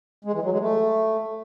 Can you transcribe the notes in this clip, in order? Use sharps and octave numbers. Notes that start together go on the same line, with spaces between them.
G#3
E3
F#3
G#3
A3